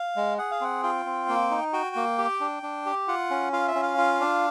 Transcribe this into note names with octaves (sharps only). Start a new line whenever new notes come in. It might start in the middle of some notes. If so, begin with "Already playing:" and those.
Already playing: F5
G#3
G#4 F#5
F5
C4 F#5
F4 G5
C4
A#3
D#4
F#4 G5
A#3
G4
D4
D4
G4
F4 F#5
C#4
F4 F5
E5
C#4
F5
F4
D4